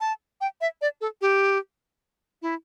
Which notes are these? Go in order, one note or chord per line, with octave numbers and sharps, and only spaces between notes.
A5
G5
E5
D5
A4
G4
E4